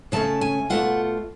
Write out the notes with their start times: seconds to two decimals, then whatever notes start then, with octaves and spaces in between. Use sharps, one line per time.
0.12 C#3 F3 A3 C#4 A5
0.41 G#5
0.70 B2 A3 F4 F#5